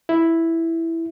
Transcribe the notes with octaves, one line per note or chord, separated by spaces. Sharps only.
E4